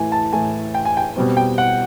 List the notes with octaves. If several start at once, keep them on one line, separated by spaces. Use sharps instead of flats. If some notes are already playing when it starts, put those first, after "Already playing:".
Already playing: A2 E3 A3 G#5
A5
A2 E3 A3 G#5
G5
G#5
G5
B2 G3 C4
G5
F#5